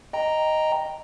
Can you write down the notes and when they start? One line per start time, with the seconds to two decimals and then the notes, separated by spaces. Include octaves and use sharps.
0.13 D#5 G5 A#5